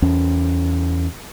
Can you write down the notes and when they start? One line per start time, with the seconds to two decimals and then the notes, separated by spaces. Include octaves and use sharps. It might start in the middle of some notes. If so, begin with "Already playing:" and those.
0.02 E2 C#4